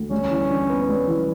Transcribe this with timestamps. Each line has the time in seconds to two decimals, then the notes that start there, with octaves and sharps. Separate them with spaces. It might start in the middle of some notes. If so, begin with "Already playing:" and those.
Already playing: D2
0.11 G3 C#4
0.30 E3
0.50 D4
0.70 B3
0.89 G3
1.08 E3